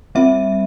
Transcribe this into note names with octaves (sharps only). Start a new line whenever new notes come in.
G3 C4 E5